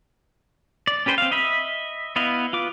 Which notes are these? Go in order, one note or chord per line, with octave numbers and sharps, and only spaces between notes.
D5
C#4 G4 B4 C5 G5
C4 F5
D#5 E5 B5
B3 E4 D#5 F5
F4 B4 D6